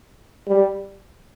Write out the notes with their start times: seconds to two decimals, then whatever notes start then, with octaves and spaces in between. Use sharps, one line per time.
0.48 G3